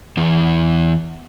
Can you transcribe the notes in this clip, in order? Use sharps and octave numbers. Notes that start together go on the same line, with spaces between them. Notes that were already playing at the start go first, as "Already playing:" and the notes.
E2 E3